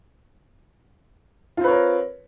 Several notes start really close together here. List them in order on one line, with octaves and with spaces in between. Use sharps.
F4 C4 B4 C#5 A#4